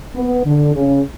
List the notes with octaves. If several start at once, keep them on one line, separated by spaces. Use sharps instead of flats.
B3
D3
C#3